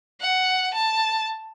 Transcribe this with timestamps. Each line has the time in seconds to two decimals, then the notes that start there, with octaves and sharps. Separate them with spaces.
0.21 F#5
0.74 A5